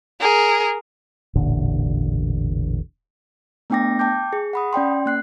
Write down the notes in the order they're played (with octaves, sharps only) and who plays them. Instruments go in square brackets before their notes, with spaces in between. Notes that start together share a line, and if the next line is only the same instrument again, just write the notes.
[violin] G#4 A#4
[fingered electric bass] E1 A1 A#2 D3
[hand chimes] A3 B3 D4 G5 D6 A#6
G5 A5 D6 G6
G#4
F#5 B5 D#6
C#4 D5 G5 C6
A#3 F#6 C7